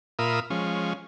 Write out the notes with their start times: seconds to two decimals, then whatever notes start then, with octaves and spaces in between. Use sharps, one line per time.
0.19 A#2 F4 A#4 E5 B5 D#6
0.50 F3 G#3 C#4